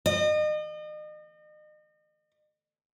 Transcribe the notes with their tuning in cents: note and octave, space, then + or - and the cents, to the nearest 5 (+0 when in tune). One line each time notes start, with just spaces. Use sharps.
D#5 -35